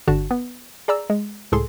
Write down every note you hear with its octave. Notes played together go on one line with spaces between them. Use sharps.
G1 D3 D4 F#4 A5
B3
G#4 D5 A#5 E6
G#3
C#2 A2 G#4 A4 C6